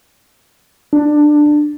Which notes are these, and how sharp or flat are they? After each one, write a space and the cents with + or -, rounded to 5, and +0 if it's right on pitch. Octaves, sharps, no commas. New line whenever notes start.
D4 +15